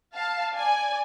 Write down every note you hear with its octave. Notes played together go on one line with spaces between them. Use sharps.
F5 A5
D5 G#5